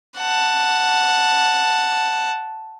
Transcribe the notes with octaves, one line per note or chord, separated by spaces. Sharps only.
F#5 A5